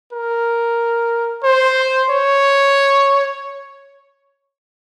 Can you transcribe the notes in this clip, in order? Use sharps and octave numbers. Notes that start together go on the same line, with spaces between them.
A#4
C5
C#5